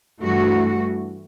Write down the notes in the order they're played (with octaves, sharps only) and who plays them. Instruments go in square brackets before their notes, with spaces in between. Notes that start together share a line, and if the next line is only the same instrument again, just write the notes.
[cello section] G2 E3 A3 F#4